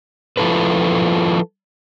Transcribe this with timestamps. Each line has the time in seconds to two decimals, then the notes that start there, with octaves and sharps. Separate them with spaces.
0.37 F3 E4 F4 A4 B4